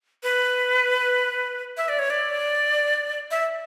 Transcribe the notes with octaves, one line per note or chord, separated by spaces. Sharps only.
B4
E5
D5
C#5
D5
E5